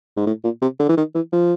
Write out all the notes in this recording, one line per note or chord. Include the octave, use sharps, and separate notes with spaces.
G#2
A2
A#2
C3
D3
E3
D#3
E3
F3